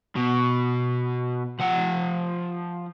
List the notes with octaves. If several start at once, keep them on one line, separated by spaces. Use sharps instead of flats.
B2
F3 F#5